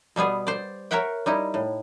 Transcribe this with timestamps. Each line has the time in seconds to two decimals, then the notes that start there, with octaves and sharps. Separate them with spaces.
0.16 B2 G3 B3 G#4
0.47 C5 D5
0.91 A#4 C#5 E5 F#5 G5
1.26 G3 D#4 E4
1.54 A2